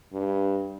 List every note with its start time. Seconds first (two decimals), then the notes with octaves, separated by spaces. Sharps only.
0.13 G2